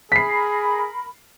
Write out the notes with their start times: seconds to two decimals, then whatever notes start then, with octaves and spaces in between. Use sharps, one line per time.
0.12 G#4 A#4 B5 B6 C7